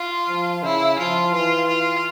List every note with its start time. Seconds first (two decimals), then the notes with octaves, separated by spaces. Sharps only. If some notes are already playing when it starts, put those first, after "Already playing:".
Already playing: F4
0.28 F3
0.63 C#3 E4
0.98 F3 F4
1.33 E3 F4
1.68 F4